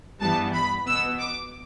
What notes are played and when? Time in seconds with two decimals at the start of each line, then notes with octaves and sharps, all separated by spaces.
0.21 G2 E3 G3 B3 A5
0.55 B5
0.87 B2 B3 E6
1.20 D6